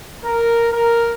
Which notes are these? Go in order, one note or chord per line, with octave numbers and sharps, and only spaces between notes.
A#4
A#4